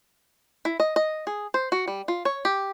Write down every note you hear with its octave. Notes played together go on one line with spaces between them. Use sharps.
E4
D#5
D#5
G#4
C5
F#4
G3
F4
C#5
G4